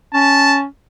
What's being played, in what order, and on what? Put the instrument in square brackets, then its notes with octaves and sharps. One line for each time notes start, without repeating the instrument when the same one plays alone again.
[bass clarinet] C#4 [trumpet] A5